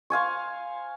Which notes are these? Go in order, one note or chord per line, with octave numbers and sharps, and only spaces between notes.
C5 F5 G#5 C#6